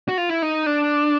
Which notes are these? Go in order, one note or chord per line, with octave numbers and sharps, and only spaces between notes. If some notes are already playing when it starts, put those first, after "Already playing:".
F#4
F4
E4
D#4
D4